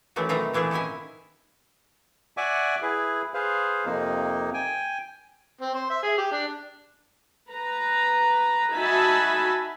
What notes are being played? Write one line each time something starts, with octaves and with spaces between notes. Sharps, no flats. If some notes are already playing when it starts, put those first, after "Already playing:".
D#3 E3 F#3 A3 C#4
B2 D#3 A3 C4 D#5 A#5
A#2 E3 A3 D4 G#4
D#3 C#4 E4 D#5 G#5
D5 E5 F#5 G#5 C#6 D6
E4 G#4 B4
G#4 B4 C5 F5
F2 C3 A#3 D#4
G5 G#5
C4
C5
E5
G#4
G4
D4
B4 A#5
D#4 F#4 E5 G#5 A5 B5